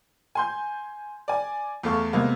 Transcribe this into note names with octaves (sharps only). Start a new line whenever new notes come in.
G#5 C6 G6
D5 G#5
E2 A3 A4 F5 C#6
C3 G#3 A#3 B3 F5